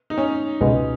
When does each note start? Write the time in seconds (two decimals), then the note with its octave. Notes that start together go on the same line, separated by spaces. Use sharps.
0.10 D#4
0.18 C#4
0.61 C#2 B2 G#3 B3